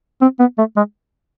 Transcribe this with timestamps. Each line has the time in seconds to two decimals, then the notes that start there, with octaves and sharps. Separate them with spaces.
0.21 C4
0.39 B3
0.58 A3
0.76 G#3